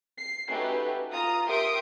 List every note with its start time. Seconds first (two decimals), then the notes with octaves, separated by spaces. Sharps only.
0.18 C7
0.49 A3 C#4 D#4 F#4 G4 B4
1.10 F4 A#5 D#6
1.47 G4 A#4 E5 C6 D#6 D7